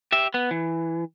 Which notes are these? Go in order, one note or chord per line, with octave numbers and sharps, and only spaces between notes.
G4 E5
B3
E3